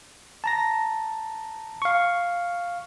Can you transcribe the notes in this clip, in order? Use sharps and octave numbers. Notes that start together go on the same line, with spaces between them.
A5 A#5 A#6
F5 C#6